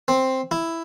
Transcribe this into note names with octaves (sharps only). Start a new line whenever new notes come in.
C4
E4